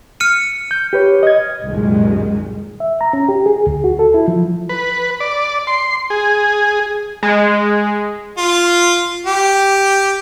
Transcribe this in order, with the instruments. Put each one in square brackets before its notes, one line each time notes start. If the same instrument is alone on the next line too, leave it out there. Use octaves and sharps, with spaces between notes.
[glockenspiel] F6 C#7 D#7
[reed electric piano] G6
G4 B4 C#5
D#5 G#6
[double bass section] C2 F#2 A#2 D#3 G3 G#3
[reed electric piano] E5
A#5
C#4
G4
G#4
D2
F#4
A4
E4
F3
[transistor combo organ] B4
D5
C6
G#4
[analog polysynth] G#3
[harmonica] F4
G4